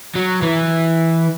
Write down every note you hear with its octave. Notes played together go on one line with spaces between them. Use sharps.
F#3
E3